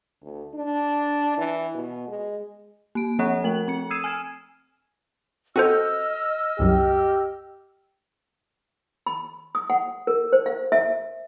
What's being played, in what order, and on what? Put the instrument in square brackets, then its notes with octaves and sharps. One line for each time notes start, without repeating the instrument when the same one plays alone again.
[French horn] D2
D4
E3
B2
G#3
[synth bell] A#3 D7
F3 C4 C#5 F#5 C#6 F#6
A3 A#4 F#7
C4 C#7
D#6 E6 G#6 C7 D#7 E7
G#5 F6 G#6 E7
[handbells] C4 A4 C5 [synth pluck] F#4 [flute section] D#5 E6 F6
[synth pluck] C2 F#2 [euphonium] G4
[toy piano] B5
D#6
F#5
A#4
C5
F5
E5